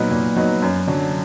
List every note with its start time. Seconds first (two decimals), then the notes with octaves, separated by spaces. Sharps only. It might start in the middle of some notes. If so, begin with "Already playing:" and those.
Already playing: A#2 F#3 B3 D#4
0.11 A#2
0.36 F#3 B3 D#4
0.62 F#2
0.88 D3 F#3